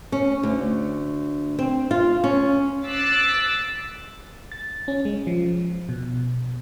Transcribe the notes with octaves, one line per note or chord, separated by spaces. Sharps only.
C#4
D2
C4
F4
C#4
D6 E6 F#6 A6 B6 C7
A6
C#4
G#3
F3
B2